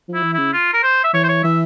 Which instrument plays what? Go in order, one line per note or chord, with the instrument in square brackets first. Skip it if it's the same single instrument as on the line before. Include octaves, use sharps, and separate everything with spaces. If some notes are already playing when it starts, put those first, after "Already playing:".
[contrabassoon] F3
[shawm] E4
[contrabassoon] E3
[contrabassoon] C#3 [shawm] E4
[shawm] F4
A#4
C5
E5
[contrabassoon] E3 [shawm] C#5
[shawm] C5
C#5
[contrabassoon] E3 [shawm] E5